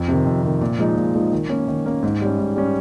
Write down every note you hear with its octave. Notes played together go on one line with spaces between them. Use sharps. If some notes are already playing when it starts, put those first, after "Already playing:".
Already playing: F2
C3 D#3
F2
C3 D#3
A#2
F3 G#3 D#4
A#2
F3 G#3 D#4
D#3
A#3 C#4
D#3
A#3 C#4
G#2
G3 C#4
G#2
G3 C#4